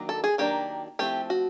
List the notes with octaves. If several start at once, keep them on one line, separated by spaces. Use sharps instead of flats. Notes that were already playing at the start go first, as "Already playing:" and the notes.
Already playing: D#3 F#3 A#3 D4
A4
G#4
D#3 F#3 A#3 D4 G4
F3 A3 C4 E4 G4
F#4